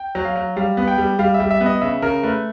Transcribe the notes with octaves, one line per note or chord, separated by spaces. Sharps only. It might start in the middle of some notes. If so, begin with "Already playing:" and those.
Already playing: G5
F#3
F5
F#3
G3 F5
B3
G5
G3
G3 F5
E5
G3
E5
B3
D#5
C#3 E5
C#3 A#4
A3 B4